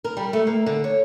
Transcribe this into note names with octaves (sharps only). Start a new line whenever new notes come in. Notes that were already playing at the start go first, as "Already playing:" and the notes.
A#4
G3
A3
A#3
D3
C#5